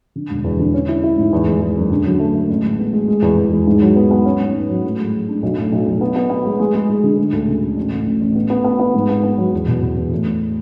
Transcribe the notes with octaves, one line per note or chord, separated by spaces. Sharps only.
D3
E1
E2
D3
C#4
E4
E4
G#2
E2
G#3
G#3
F#1
D3
F#3
A3
A3
A1
G#3
B3
G#3
G#3
E2
E2
G#3
G#2
F#3
B3
B3
C#4
G#2
G#2
F#3
A2
G#3
G#3
D4
B1
A2
B1
B1
B3
B3
B3
G#3
G#3
G#3
G#3
D3
G#3
D2
C#3
C#3
A1
A2
A1
A1
B3
B3
B3
B3
G#2
B3
B3
F#3
E2
B2
E2
E2
A2
A2